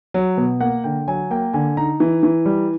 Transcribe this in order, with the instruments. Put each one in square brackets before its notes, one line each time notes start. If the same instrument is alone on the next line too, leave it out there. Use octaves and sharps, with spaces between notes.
[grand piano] F#3
B2
A#3 F#5
D3 G5
F#3 G#5
A#3 G5
D3 G#5
D#4 A#5
E3
E3
G3